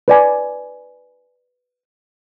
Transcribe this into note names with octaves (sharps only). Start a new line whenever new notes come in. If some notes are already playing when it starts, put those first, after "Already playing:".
B4 D5 G#5